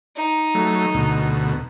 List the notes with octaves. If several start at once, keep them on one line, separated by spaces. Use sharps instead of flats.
D#4
F#3 A3
D2 B2